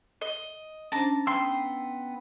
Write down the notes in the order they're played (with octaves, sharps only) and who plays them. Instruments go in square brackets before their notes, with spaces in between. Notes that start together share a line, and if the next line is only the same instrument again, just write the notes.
[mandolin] D#5
[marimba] C#4 D4 C5 [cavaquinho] A5 A#5
[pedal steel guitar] B3 G5 E6 [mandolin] C6